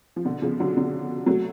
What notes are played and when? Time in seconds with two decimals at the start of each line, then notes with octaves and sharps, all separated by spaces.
0.16 F3
0.25 B2 D3
0.42 C#3 F3
0.60 D3 F#3
0.77 D3 F#3
1.26 F#3 A3